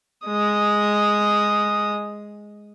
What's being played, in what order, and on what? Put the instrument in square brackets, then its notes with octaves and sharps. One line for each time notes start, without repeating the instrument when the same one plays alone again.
[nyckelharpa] G#3 D#6